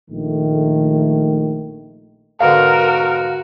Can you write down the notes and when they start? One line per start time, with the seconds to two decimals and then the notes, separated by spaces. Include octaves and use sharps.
0.11 A#1 D#3 A3
2.41 G#2 B2 D3 F#4 A#4 F5